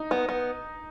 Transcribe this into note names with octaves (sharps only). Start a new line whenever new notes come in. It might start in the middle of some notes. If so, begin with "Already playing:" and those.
Already playing: D#4
B3
B3